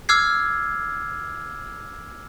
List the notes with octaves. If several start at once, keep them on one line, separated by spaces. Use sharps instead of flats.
D6 E6 F6 G#6 C7